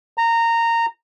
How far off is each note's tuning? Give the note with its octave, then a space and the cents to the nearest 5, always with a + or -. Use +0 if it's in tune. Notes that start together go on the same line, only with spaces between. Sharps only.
A#5 -15